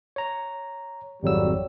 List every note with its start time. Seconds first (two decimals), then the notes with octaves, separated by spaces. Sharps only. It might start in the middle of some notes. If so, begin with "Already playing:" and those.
0.16 C#5 A#5
1.23 G#1 F2 F#3 G3 E6